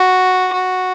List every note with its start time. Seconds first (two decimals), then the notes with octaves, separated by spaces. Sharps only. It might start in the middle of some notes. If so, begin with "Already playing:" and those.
Already playing: F#4
0.53 F#4